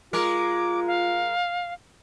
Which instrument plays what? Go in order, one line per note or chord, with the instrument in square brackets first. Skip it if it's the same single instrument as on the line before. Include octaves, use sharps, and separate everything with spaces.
[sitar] G#3 A#4 [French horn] F4 [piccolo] D6
[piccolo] F5